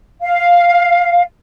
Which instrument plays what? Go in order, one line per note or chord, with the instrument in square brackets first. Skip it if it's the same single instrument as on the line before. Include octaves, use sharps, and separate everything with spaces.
[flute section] F5